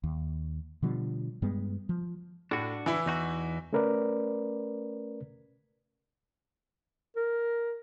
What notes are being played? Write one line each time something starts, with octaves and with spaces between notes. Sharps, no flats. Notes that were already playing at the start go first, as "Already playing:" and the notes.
D#2
B2 D3 F3 G3
G2 G3 G#3 B3
F3
A2 D4 F#4
E3 E4
E2 D#4 F#4
A3 C#4 A#4 B4 D5
A#4